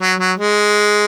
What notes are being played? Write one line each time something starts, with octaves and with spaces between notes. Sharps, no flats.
F#3
F#3
G#3